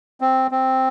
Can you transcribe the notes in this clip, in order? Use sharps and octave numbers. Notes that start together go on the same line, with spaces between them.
C4
C4